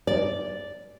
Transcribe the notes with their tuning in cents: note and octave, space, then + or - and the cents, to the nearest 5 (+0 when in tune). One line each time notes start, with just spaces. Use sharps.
D5 -5